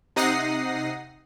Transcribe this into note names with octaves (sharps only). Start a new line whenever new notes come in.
C3 D#4 F#5 D#6 A#6 C7